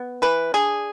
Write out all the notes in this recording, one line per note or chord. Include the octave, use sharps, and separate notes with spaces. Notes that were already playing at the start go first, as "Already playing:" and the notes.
Already playing: B3
E3 B4
D4 G#4